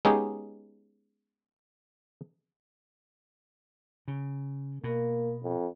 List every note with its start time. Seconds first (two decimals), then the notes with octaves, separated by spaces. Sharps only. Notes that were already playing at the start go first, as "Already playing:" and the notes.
0.05 G#3 B3 C#4 D#4 G4 G#4
4.08 C#3
4.84 B2 A#3
5.43 F2